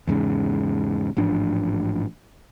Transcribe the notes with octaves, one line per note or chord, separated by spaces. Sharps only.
E2 G#2 C#3
A1 G#2 F3 D4